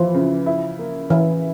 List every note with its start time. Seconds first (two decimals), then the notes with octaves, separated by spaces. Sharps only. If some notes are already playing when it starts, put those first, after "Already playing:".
Already playing: E3 F3
0.14 C#3
0.46 E4
0.79 A#3
1.10 E3 E4